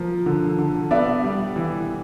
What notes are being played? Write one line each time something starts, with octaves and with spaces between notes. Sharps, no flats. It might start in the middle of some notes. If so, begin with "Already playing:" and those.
Already playing: F3 A#3
D3
D3
B3 D5 E5
G3
E3